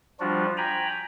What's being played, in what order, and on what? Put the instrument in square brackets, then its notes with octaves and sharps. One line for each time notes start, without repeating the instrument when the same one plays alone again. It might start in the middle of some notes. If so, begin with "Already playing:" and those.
[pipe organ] F3 G3 D4 F4 F#4
G5 G#5 A#5 B5